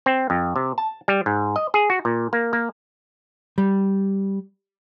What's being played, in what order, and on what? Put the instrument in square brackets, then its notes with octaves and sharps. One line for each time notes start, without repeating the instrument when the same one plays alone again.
[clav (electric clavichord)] C4
F2
C3
A5
G3
G#2
D#5
G#4
F#4
A#2
A#3
A#3
[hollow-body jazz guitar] G3